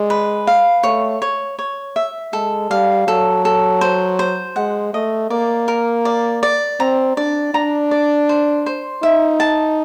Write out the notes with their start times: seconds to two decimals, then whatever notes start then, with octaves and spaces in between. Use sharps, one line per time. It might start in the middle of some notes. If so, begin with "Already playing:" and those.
Already playing: G#3 D5
0.10 B4
0.47 F5
0.83 A3 C#5
1.22 C#5
1.59 C#5
1.96 E5
2.33 G#3 A4
2.70 G3 F5
3.07 F#3 A4
3.45 A4
3.81 C5
4.19 C5
4.56 G#3 F#5
4.93 A3 D#5
5.30 A#3 D5
5.68 A#4
6.05 D5
6.43 D5
6.80 C4 A#5
7.17 D4 D5
7.54 D4 A#5
7.91 D5
8.29 C5
8.66 C5
9.03 D#4 E5
9.40 A5